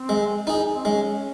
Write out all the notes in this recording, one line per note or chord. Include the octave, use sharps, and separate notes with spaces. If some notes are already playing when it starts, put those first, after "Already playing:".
Already playing: C4
G#3
D#4 G#4
C4
G#3 C#4